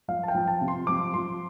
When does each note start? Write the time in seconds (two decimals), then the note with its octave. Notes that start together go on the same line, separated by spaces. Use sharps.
0.08 F3 F5
0.23 A5
0.28 G5
0.35 F3
0.48 A5
0.61 C3
0.68 C6
0.87 F3 D6
1.14 F3 C6